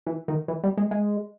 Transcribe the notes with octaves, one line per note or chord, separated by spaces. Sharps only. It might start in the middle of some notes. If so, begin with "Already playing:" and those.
E3
D#3
E3
G3
G#3
G#3